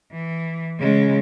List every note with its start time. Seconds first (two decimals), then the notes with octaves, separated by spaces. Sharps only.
0.12 E3
0.79 C#3 G#3